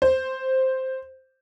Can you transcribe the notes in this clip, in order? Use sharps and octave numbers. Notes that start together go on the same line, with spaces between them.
C5